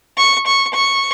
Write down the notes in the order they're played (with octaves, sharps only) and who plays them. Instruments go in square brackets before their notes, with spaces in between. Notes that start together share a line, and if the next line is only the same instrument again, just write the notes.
[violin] C#6
C#6
C#6